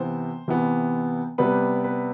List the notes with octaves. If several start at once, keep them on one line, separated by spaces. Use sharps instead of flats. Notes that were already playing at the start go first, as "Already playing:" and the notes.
Already playing: C3 E3 B3 C5
C3 E3 B3
C3 G3 B3 B4
B4